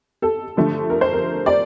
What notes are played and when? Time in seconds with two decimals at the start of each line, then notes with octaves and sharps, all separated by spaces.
0.22 A4
0.57 D3 F3 A3
0.90 A#4
1.01 C5
1.13 A#4
1.46 D5